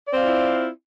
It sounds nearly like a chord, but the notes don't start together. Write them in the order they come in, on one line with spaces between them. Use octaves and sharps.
D5 C4 F5 F4 E4